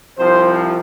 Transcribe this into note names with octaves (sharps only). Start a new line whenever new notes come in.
C2 C3 F3 C5